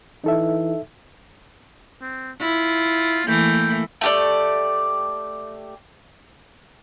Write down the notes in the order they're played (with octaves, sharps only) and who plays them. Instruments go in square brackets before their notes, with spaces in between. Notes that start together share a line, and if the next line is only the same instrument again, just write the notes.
[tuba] E3 [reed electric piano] D#4 A4 E5
[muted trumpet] C4
[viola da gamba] E4 [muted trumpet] F4
[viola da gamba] E3 A3 A#3 [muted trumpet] G5
[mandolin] A3 G4 D5